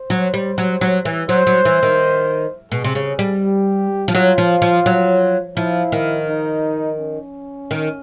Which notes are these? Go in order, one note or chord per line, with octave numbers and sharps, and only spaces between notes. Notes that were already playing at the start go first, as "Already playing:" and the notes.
Already playing: C5
F#3
G3
F#3
F#3
E3
F#3 C5
F#3
E3
D#3
B2 G#4
C3
C#3
G3
G4
F3
F#3 F4
F3
F3
F#3
F3 E4
D#3
D#4
C#4
D#3